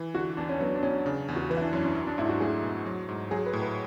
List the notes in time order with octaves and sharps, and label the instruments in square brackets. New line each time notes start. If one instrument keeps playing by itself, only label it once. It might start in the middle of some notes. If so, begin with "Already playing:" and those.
Already playing: [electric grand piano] E3
[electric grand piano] D3 [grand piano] F#4
[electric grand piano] E2 [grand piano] D4
[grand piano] C#4
[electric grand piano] F#3 [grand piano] B3
[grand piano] D4
[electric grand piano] B2 [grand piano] C#4
[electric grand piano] C#3 [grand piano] D4
[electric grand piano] E2
[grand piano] F#4
[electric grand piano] E3 [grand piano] B4
[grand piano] E4
D4
[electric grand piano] F#2 [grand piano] C#4
[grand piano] C#4
[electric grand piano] F#3
[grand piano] D4
[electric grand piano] G#2 [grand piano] E4
[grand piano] F#4
[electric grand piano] A3 [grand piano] G#4
[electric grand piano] B2
F#3
G#2
[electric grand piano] F#3 [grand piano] G#4
[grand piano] B4
[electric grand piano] A2
[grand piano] B4